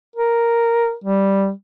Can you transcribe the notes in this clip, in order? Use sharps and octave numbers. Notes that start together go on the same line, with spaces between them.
A#4
G3